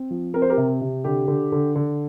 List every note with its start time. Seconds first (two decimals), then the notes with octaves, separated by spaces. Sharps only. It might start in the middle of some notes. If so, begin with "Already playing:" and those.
Already playing: C4
0.10 F3
0.34 C4 A#4
0.42 C5
0.49 G4 A#4
0.57 C3
0.81 C3
1.04 D3 G4
1.28 D3
1.52 D3
1.75 D3